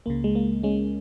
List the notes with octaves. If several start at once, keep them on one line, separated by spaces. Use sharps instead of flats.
C#2 C#3 A#3
G#3
A#3
G#3 C#4